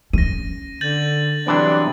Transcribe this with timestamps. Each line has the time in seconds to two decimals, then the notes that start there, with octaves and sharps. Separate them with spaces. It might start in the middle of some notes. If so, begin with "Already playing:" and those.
0.13 C#4 A#6 D#7
0.81 D3 G6 A6 F#7
1.47 C3 E3 F#3 G3 B3 D4